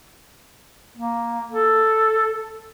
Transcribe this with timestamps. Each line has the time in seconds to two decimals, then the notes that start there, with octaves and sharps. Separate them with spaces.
0.98 A#3
1.52 A4